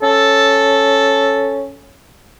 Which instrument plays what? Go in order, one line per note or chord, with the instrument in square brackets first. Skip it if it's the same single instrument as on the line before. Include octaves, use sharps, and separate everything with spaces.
[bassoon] C#4 [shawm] A4